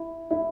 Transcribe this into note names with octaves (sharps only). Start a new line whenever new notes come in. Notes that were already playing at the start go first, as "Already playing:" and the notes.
Already playing: E4
E4